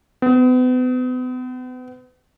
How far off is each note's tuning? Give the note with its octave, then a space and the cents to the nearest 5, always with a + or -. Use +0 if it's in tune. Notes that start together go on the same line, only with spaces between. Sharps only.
B3 +40